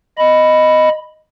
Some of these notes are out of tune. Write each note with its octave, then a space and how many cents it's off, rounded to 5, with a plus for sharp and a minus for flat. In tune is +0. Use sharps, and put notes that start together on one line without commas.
D#5 +0 B5 +0